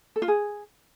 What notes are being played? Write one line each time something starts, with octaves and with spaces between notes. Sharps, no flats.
A4
F4
G#4